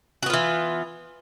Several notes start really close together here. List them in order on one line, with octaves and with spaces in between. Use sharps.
F#4 B3 F4 E3